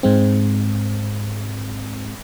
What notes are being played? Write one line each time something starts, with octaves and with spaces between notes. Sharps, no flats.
G#2 G#3 C4